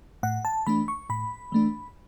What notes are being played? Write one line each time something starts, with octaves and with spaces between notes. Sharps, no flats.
A2 F#5
A5
E3 A3 D4 B5
C#6
A2 B5
E3 A3 D4